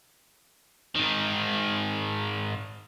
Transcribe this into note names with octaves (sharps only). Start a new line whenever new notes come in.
G#2 D#3